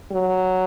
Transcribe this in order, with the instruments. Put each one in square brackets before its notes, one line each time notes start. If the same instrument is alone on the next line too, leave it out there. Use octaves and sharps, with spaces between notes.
[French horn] F#3